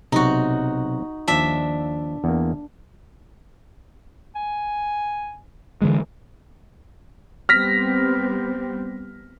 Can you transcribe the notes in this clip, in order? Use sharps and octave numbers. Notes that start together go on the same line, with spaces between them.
B1 C3 D#4 F#4 D#5
D#2 F3 D4 E5
E2 A#3
G#5
D3 E3 G#3
G3 B3 C4 F6 A#6 B6